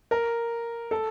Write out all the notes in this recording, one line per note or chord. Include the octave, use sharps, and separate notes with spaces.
A#4
A4